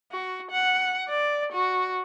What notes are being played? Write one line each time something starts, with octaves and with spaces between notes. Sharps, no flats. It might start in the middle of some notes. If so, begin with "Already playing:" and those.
F#4
F#5
D5
F#4